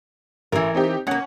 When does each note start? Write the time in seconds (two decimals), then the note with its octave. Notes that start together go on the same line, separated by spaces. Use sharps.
0.52 A1 E3 A#4
0.74 C4 D#4 G4
1.07 B2 A#3 C#4 F#5